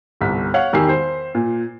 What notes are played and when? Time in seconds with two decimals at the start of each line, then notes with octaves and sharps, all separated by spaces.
0.21 G1 C2 B6
0.54 C#5 F5 F#5
0.73 E1 D#3 G4 G#5 E6 C7
0.89 C5
1.35 A#2